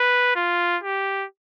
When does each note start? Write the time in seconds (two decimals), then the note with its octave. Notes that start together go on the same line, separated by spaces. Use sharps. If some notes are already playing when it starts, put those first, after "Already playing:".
Already playing: B4
0.36 F4
0.83 G4